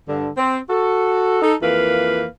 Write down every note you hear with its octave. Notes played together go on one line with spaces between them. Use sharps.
G2 D3
C4
F#4 A4
D#4 A4
F2 E3 A#3 B4 F5